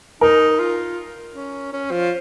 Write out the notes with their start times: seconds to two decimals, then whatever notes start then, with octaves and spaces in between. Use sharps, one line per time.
0.21 D#4 A#4
0.59 F4
1.35 C#4
1.73 C#4
1.91 F3